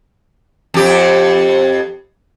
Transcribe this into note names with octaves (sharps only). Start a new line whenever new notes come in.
F2 G4